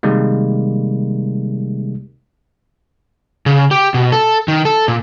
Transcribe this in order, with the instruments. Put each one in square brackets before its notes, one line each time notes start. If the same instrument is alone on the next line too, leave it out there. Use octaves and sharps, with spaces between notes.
[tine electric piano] C3 D#3 G3 G#3 A#3
[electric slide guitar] C#3
G4
B2
A4
D#3
A4
A#2